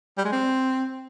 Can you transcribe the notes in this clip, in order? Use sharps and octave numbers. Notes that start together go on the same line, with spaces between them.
G3
G#3
C4